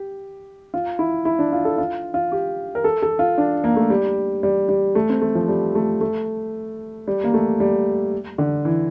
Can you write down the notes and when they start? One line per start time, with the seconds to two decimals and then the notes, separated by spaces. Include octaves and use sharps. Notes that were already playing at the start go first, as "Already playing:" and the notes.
Already playing: G4
0.74 F4
0.99 E4
1.25 E4
1.39 D4
1.52 F4
1.65 A4
1.78 F4
2.14 F4
2.32 G4
2.75 A#4
2.84 A4
3.02 A4
3.19 F4
3.38 D4
3.64 A#3
3.76 A3
3.90 G3
4.43 G3
4.69 G3
4.95 A3
5.09 C4
5.21 A3
5.35 F3
5.48 G3
5.75 A3
6.01 A3
7.07 G3
7.24 A#3
7.34 A3
7.60 G3
8.38 D3
8.65 E3